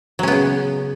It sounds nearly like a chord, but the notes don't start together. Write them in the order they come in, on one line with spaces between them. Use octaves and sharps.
F#3 C#4 B3 C#3